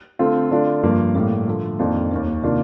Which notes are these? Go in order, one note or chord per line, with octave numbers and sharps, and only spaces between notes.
D3 A3 C4 F4
D3 A3 D4 F4
G2 F3 A#3
A2 G3 A#3
D3 F3 A3
F2 D#3 A#3 D4 F4
D#2 D#3 A#3
C3 D#3 A#3 D4 F4